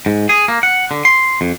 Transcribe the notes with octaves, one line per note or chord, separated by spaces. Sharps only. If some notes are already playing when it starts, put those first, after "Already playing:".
G#2
G#4
A#3
F#5
D3
C6
F2